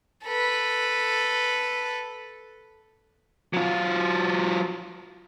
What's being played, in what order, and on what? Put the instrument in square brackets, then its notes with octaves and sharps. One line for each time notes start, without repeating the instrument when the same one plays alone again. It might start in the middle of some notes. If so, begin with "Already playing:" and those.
[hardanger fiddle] A4 B4
[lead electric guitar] F#3 F4